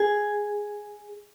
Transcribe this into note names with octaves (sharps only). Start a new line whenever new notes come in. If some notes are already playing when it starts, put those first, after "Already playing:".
Already playing: G#4